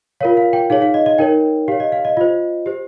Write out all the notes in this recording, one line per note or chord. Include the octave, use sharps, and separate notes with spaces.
F4 A#4 C#5 F5
F5
G5
D#4 G#4 C#5 F5
F5
D#5
D#5
D#4 A#4 C#5 G5
G4 C#5 F5
D#5
F5
D#5
F4 C5 D#5
G4 C5